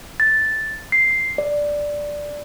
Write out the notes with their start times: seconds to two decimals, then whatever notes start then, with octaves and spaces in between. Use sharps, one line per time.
0.20 A6
0.92 C7
1.38 D5